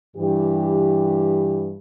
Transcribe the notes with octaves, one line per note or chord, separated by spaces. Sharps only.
G2 E3 G4